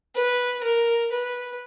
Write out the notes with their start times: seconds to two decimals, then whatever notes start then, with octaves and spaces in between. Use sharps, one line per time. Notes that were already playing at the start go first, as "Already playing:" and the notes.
0.15 B4
0.63 A#4
1.11 B4